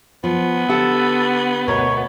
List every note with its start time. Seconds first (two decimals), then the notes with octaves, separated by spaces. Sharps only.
0.24 F3 B3
0.69 D3 G4 A4 F#5
1.68 D2 B2 A#4 C#5